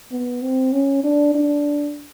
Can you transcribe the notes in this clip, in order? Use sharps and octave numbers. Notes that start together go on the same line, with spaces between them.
B3
C4
C#4
D4
D4